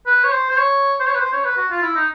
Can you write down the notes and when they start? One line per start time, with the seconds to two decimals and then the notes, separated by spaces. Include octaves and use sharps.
0.07 B4
0.24 C#5
0.32 C5
0.51 C5
0.58 C#5
1.00 C5
1.07 C#5
1.15 B4
1.21 C5
1.33 C#5
1.45 B4
1.57 F#4
1.71 F4
1.83 E4
1.96 D#4